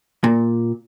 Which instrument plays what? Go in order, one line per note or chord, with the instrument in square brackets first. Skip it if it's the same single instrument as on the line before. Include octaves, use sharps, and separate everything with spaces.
[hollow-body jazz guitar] A#2